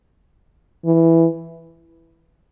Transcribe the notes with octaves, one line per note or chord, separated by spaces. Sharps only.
E3